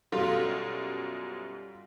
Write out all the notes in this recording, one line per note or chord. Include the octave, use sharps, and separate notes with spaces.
F#2 B2 G3 F4 F#4 A4